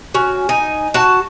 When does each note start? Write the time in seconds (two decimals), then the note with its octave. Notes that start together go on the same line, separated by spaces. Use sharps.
0.14 C#4 F#4
0.49 D#4 G#5
0.94 F#4 A5